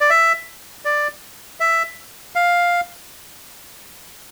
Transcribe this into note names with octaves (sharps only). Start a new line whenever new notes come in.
D5
E5
D5
E5
F5